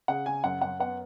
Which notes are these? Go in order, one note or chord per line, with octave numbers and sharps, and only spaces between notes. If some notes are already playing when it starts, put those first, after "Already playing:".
C#3 F#5
C#3 G#5
F#2 F#5
F#2 F#5
B3 F#5